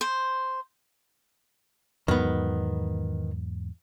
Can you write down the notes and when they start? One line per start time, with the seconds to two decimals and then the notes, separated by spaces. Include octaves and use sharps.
0.01 C5
2.08 E2 G#2 D#3 F#3 B3